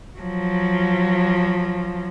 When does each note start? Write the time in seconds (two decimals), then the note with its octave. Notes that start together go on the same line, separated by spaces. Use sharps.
0.19 F3 F#3